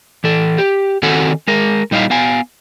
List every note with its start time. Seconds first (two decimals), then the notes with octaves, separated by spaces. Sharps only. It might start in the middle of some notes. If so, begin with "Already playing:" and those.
0.24 E3 A4
0.58 G4
1.03 D#3 C4 F#4 A4 F#5 G#5
1.48 G#3 A#4
1.91 A#2 G3 D#4 E4 F5
2.10 B3 F5 G#5